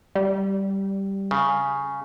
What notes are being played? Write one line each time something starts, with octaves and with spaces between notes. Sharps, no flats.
G3
C#3